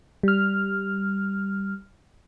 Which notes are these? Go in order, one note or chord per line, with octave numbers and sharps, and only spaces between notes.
G3 F6